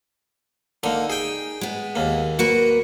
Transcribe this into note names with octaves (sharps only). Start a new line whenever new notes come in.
D3 A#3 D#4
G#4 G5
G#3 B3
D#2 A#3
A#3 F#4 A#4 B4